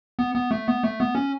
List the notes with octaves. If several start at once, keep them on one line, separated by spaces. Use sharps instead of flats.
B3
B3
A3
B3
A3
B3
C#4